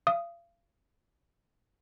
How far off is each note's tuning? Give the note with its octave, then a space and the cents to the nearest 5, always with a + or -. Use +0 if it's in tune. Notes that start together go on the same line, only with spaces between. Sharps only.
F5 -35 D#6 +0